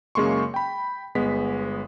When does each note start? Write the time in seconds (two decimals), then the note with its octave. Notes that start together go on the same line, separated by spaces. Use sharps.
0.15 F#2 C#3 G#3 A#3 C6 C#6
0.54 G5 B5
1.15 G1 G#3 B3 B6